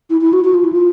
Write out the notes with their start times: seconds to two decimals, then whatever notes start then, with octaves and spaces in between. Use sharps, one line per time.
0.10 E4
0.21 E4
0.33 F#4
0.44 F#4
0.54 F4
0.64 E4
0.73 F4